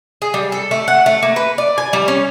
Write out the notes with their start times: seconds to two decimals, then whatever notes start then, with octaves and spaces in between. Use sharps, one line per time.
0.22 G#4
0.34 G3
0.52 A4
0.71 A3
0.88 F#5
1.06 A3
1.23 A#3
1.36 B4
1.58 D5
1.78 G#5
1.93 G3
2.08 C#4